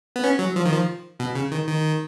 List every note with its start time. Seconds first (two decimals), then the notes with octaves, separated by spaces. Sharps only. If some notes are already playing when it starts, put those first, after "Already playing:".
0.16 B3
0.24 C#4
0.39 F#3
0.56 F3
0.65 D#3
0.72 F3
1.20 B2
1.35 C#3
1.51 D#3
1.68 D#3